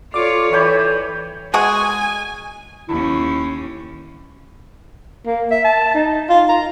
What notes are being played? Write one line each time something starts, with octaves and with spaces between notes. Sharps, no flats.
F4 A4 C#5 D5 D6
E3 C#5 G5 B5
G#3 F#4 G#4 G#5
D#2 C#4 E4
A#3
E5
A5
D#4
F4
A#5